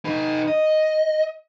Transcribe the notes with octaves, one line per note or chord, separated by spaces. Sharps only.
D#4 B4
D#5